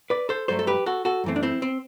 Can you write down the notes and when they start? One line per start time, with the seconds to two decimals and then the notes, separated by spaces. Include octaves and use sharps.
0.10 B4 D5
0.29 A4 C5
0.48 G2 F#3 A3 A4 C5
0.59 A4
0.67 G4 B4
0.86 F#4 A4
1.05 F#4 A4
1.24 F#2 E3 A3 C4
1.36 D4
1.43 C4 E4
1.62 C4